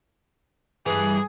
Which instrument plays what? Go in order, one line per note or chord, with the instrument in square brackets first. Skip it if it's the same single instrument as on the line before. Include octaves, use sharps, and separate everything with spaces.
[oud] G2 E3 [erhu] G#4